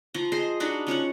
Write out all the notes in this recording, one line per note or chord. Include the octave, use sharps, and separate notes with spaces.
F3 A#5
G#4 C5 D#5 C6
D4 D#4 F#4 B5
F3 C#4 C#5 F#5